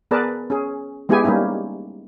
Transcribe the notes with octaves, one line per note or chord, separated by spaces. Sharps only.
B3 G#4 A#4 B4 D5 A5
C#4 G#4
G#3 B3 E4 G4 G#4 G#5
G3 A#3 C#4 D#4 E4